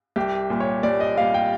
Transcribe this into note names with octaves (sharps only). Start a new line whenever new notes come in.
C2 G4
A#2 G3
C#5
C2 D5
D#5
A#2 G3 F5
G5